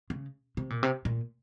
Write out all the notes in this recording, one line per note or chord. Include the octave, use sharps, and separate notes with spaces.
C#3
C3
A#2
C3
A#2